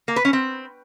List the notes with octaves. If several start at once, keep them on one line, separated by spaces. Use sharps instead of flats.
A#3
B4
C#4
C4